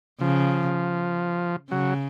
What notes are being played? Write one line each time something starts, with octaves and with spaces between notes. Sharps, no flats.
C#3 F3
C#3 F#3